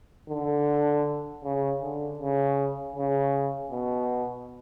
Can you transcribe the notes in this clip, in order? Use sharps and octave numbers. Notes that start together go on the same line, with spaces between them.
D3
C#3
D3
C#3
C#3
B2